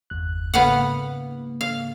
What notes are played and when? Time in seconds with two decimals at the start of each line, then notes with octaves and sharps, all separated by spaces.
0.10 G1 E2 F#6
0.54 G#2 C#3 A#3 B3 F5 F#5
1.61 F5